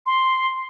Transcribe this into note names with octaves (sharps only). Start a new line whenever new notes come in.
C6